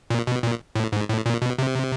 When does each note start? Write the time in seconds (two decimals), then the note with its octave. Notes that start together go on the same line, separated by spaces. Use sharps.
0.10 A#2
0.27 B2
0.43 A#2
0.75 A2
0.92 G#2
1.09 A2
1.26 A#2
1.42 B2
1.58 C3